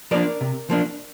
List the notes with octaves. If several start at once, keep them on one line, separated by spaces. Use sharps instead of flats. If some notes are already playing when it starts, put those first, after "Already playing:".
F3 A#3 D4 A#4 D5
C3
F3 A#3 D4